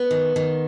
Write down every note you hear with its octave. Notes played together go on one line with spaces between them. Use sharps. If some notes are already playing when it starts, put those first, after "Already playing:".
Already playing: B3
D#3
D#3